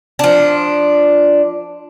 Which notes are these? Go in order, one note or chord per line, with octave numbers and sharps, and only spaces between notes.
F3 D4